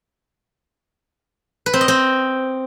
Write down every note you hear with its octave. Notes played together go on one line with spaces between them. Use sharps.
B4
C4
D#5
C4